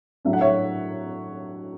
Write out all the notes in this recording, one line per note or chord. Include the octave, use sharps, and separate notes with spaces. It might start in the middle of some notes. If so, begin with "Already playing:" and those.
A2 F#3 A3 D4 E5
F#5
C#5 E5